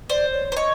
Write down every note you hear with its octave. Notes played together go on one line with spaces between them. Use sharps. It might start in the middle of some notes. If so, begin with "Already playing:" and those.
C5 D5
C#5
C5
C#5 D#5